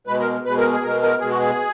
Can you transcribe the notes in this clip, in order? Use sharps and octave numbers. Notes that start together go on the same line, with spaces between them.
B2 G#3 B4
A#4
B2 G#3 B4
A#4
G#4
B2 G#3 A#4
A#4
B2 G#3 G#4
F#4
G#4